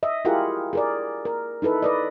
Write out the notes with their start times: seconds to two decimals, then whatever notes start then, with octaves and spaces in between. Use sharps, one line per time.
0.03 D#5 E5
0.25 E4 F4 G4 G#4 A#4 F#5
0.73 G#4 A#4 D5
1.25 A#4
1.62 D#4 E4 A4 B4
1.82 B4 D5 D#5